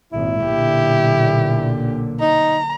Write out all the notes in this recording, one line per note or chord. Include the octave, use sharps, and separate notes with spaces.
G#1 A#2 E4
B1 A#2 D3 G4
D#4 A#5